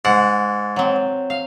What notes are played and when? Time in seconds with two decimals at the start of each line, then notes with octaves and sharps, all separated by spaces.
0.05 G#2 F#5
0.76 F#3 C4
1.30 F5